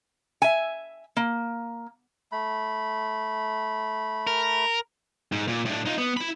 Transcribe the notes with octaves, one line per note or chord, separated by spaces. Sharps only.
E5 G#5
A#3
A3 B5
A#4
G#2
A#2
A2 D4
D#4 F4
B3
E4 B5